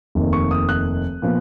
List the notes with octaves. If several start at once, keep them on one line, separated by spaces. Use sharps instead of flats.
F1 D#2 D#3
C#6
D#6
F#6
A#2 F3 B3